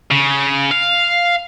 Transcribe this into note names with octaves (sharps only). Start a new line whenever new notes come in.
C#3
F5